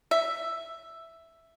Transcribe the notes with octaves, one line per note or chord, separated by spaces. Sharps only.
E5